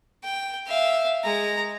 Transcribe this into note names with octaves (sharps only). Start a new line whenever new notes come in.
G5
E5 F5
G#3 A#5